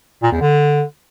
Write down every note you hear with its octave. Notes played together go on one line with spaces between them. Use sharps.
A#2
E2
D3